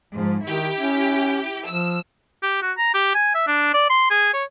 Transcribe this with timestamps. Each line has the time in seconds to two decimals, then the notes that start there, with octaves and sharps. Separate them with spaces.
0.13 G#2 F3
0.45 D#3 E4 G4
0.78 C#4
1.67 F3 E6
2.43 G4
2.62 F#4
2.78 A#5
2.94 G4
3.14 G#5
3.35 E5
3.47 D4
3.74 D5
3.89 C6
4.10 G#4
4.34 C#5